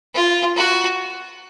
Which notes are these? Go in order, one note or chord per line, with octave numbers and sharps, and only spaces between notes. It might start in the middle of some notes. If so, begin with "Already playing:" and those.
F4
F#4